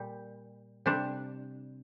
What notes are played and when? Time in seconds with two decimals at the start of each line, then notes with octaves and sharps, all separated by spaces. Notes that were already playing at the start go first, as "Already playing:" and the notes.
Already playing: A#2 G3
0.86 C3 G3 D4